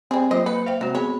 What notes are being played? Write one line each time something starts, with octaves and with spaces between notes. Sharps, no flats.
G3 C4 G#4
F#3 A#3 F4 C5 D#5
A#3 B4 C#7
C5 E5 F5 G5
C3 F#3 G#3 C4 F#4
B3 G#4 C#5 B5